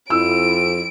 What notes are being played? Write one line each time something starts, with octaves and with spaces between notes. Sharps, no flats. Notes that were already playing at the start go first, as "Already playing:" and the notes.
F2 E4 E6 D7